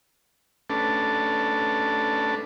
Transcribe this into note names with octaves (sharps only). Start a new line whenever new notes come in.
A3 C#4 D4 A4 B4 A5